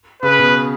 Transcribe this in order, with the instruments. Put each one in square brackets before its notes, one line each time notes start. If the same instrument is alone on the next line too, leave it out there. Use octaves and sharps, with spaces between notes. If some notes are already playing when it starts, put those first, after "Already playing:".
[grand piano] C#3 [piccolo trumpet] B4
[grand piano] B2